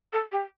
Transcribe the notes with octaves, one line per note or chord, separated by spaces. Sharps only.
A4
G4